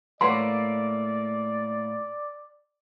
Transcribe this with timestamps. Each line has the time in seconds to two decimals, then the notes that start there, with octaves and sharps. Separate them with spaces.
0.21 A2 A#3 B4 C#5 D5 F#5 C6